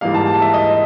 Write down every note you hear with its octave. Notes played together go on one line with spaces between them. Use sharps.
G#2 E3 G3 A#3 F5
A5
A5
E5
D#5